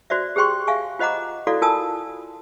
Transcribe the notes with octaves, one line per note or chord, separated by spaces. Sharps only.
F#4 C5 D5 E5
G4 G#4 C5 G5 C6 C#6
E5 F5 G#5 C#6
F4 C5 D#5 F#5 A#5 D6
E4 F#4 A4 D5 F5
F4 A#4 G#5 A5 D#6 E6